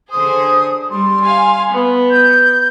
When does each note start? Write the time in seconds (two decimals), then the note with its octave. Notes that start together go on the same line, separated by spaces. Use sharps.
0.11 D3 G#4 C5 D#6
0.91 G3 C6
1.24 F5 G#5
1.69 B3
2.11 G6